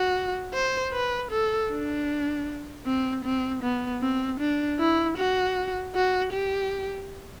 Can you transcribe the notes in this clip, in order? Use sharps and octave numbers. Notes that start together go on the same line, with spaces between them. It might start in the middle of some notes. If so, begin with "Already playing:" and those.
Already playing: F#4
C5
B4
A4
D4
C4
C4
B3
C4
D4
E4
F#4
F#4
G4